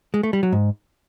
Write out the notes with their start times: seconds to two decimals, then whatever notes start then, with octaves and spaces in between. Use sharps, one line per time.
0.14 G#3
0.23 A3
0.33 G3
0.43 F#3
0.52 G#2